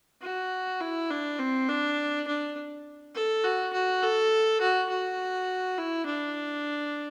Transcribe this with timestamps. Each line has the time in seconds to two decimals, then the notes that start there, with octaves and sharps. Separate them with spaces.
0.22 F#4
0.81 E4
1.10 D4
1.39 C4
1.69 D4
2.27 D4
3.15 A4
3.44 F#4
3.73 F#4
4.03 A4
4.61 F#4
4.89 F#4
5.78 E4
6.06 D4